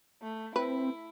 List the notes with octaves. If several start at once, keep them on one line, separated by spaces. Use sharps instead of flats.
A3
C4 E4 B4